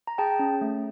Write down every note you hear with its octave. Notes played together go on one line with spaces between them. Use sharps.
A#5
G#4 G5 A5
C#4
A3